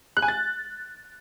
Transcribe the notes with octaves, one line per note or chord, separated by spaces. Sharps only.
F#6
G#5
A6